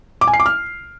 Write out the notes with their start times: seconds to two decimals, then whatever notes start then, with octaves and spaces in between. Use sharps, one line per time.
0.21 D6
0.27 G#5
0.34 C7
0.40 D6
0.46 F6